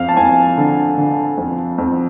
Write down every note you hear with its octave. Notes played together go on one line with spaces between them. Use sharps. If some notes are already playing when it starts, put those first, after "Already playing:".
Already playing: F2 F5
A5
F2 G#5
D3
D3
F2
F2